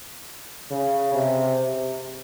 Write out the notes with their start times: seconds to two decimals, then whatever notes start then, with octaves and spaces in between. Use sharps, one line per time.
0.71 C#3
1.14 C3